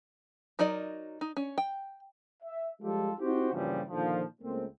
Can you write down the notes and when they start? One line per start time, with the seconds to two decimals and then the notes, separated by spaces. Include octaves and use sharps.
0.59 F#3 D#4 A#4 D5 D#5
1.21 D#4
1.37 C#4
1.58 G5
2.43 E5
2.82 F3 G3 G#3 F4 G4 A4
3.20 C4 D#4 E4 F#4 G4 C5
3.52 G2 A#2 C#3 E3 F3 G3
3.89 A#2 D3 D#3 F3
4.42 C#2 A3 A#3 C4